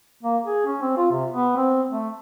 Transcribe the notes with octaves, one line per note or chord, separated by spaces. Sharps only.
A#3
G#4
C#4
C4
F4
C3
B3
C4
A3